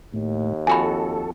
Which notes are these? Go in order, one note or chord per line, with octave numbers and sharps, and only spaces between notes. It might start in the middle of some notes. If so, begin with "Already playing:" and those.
D#2 A2
F2 F#4 A4 G#5 B5